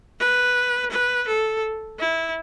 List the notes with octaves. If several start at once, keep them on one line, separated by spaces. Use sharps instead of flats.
B4
B4
A4
E4